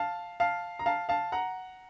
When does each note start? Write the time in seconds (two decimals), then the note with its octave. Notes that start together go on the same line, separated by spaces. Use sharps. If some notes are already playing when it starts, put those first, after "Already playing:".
Already playing: F5 A5
0.40 F5 A5
0.79 A#5
0.86 F5 A5
1.09 F5 A5
1.32 F#5 A#5